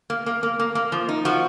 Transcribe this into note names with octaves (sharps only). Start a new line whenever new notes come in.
A#3
A#3
A#3
A#3
A#3
F3
D#4
F3 F#4